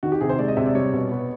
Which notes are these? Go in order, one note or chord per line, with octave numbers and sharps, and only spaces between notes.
D#3 F#4
G4
C3 G#4
C5
G#3 D5
D#5
C3 E5
D5
G3 C#5
B2
B3